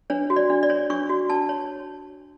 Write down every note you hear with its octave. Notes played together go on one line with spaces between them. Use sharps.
D4 C#5
F#4
D5
D4
D5
C#5
D4 C#6
F#4
D4 A5
C#5